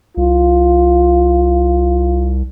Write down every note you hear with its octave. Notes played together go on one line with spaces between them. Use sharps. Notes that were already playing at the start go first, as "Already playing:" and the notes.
C2 F4